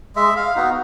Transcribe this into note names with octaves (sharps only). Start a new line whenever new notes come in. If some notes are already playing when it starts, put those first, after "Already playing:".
G#3 E5
F5
B3 D#4 F#4